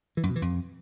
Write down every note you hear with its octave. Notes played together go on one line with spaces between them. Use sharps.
E3
F#2
B2
E3
F2